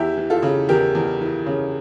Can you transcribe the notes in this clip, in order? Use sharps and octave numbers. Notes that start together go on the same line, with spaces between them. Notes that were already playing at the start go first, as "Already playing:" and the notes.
Already playing: E2 E4 G4
E3
F4 A4
C#3
E2 G4 A#4
E2
E3
C#3